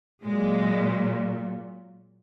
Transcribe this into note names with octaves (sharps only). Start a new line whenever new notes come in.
A#2 F#3 G#3